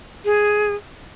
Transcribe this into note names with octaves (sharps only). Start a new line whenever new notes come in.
G#4